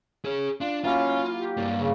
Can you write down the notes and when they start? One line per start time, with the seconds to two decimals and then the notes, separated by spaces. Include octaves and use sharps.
0.25 G#4 C#5
0.61 D4 F4
0.84 F#3 A#3 C#4 E4 F4
1.35 G4
1.57 G2 A#3 D5
1.81 C#3